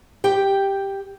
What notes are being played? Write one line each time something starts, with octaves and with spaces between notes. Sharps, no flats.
G4 G5